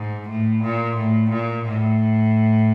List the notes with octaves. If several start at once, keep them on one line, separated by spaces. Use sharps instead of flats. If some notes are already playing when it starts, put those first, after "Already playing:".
Already playing: G#2
A2
A#2
A2
A#2
A2